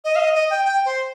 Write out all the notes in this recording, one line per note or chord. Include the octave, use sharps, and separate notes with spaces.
D#5
F5
D#5
D#5
G5
G5
C5